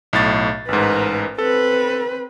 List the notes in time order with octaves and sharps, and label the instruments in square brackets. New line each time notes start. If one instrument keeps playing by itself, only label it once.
[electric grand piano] B1 A2 A6
[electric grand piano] A1 G#2 [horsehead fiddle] A#4 B4
[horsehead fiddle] C4 B4 [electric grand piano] A4